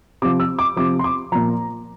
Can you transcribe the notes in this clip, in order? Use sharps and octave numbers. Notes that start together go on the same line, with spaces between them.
C3 F3 D6
E6
D6
C3 F3 D6
C6
D6
A#2 F3 A#5